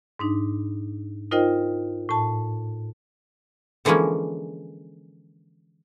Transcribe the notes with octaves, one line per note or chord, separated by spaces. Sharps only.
G#2 D4 D#4
D#4 F4 A#4 C5 D#5 G5
A2 A5
D3 E3 F3 G#3 A#3 C#4